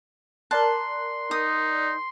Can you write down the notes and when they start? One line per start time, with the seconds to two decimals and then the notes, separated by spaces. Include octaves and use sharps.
0.51 A#4 D5 A5 C6 F#6
1.31 D#4 D#6